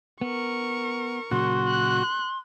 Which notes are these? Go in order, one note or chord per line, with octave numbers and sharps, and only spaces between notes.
B3 A#4 C#6
A#2 C#3 F#3 F#4 C6
F#6